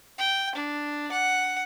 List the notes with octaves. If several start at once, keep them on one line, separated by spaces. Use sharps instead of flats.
G5
D4
F#5